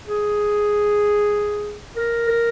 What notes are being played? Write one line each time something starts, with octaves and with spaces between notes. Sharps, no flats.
G#4
A#4
A#4